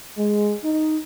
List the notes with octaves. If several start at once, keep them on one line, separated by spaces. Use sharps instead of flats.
G#3
D#4